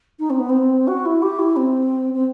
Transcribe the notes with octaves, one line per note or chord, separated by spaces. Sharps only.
D#4
C4
B3
C4
F#4
E4
G4
E4
C4
C4